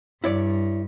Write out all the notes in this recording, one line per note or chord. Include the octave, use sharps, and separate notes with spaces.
G2 E4 C#5 D5